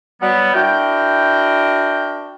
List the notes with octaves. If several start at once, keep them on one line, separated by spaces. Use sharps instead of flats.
F#3 G3 B3
D4 E4 F#4 A#4 G5